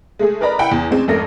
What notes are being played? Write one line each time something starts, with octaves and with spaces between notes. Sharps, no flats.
G#3 A3 G#4
A#4 B4 D5 D#5 A#5 B5
E4 F#5 G5 B5
E2
A1 G#3 C4
G#1 F2 A3 A#4 A#6